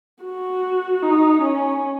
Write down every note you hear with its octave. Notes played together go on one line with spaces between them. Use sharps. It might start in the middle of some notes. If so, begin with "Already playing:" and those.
F#4
D#4
C#4